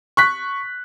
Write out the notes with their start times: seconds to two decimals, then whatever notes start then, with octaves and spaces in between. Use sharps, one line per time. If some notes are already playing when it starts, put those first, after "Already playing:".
0.17 C#6 F#6 B6